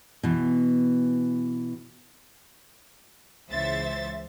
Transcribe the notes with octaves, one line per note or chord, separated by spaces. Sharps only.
B2 E3
C#2 C#3 E3 C5 E5 A6